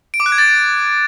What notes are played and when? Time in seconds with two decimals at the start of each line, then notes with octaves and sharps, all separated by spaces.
0.14 D7
0.20 D6
0.26 F#6
0.32 G#6
0.38 A6